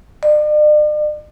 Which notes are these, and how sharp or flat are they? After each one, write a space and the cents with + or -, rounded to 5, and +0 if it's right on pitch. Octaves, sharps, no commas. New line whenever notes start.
D5 +45